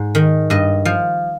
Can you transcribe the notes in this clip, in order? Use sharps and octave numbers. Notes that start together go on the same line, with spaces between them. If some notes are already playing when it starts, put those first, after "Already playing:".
Already playing: G#2
D#3
G2 D#5
F3